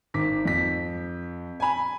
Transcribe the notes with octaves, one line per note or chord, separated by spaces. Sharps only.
G#1 D#3 D6 B6
F2 B6
G#5 B5